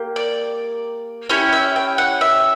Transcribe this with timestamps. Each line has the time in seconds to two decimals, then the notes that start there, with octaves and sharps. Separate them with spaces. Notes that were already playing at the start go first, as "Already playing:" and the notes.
Already playing: A#3 G4
0.16 D5
1.29 C#4 E4 G4 C#5
1.53 E5
1.76 G5
1.98 F#5
2.21 E5